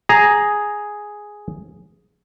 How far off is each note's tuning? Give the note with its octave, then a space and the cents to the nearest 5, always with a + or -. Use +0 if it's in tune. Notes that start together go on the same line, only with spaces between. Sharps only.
G#4 +0 A#5 +0